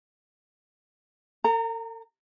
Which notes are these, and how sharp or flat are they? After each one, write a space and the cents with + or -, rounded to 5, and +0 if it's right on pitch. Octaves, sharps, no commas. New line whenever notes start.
A4 +45 A#5 -20